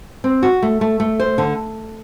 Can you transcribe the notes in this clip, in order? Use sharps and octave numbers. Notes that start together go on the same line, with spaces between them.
C4
F#4
A3
A3
A3
C5
D3